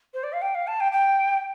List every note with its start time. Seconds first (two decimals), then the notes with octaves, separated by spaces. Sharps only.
0.14 C5
0.24 D5
0.33 F5
0.42 G5
0.55 F5
0.67 A5
0.80 G5
0.92 G5